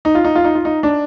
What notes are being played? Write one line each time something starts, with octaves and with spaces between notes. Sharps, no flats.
D#4
F4
D#4
F4
D#4
F4
D#4
D4